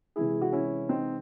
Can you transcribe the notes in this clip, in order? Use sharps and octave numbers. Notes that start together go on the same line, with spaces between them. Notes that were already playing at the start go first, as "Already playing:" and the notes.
C3 E3 G#3 E4 G#4
F#4
C#4 E4
C4 D#4